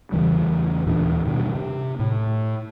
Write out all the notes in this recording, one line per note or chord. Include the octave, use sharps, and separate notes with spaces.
E2 C#3 E3 G3
D#2 A#2 E3 D4
G2 B2 D#3
C3
A2